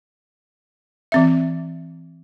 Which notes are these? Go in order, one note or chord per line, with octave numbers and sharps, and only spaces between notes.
E3 C4 E5